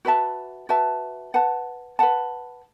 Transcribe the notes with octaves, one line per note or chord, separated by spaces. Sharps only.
F#4 B4 E5 A5
F#4 B4 E5 A5
B4 F#5 A5
B4 F#5 A5